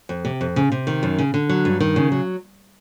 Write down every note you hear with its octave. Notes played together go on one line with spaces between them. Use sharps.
F2
C3
F2
C#3
C3
D#3
F#2
C#3
D3
F#3
G2
D#3
C#3
F#3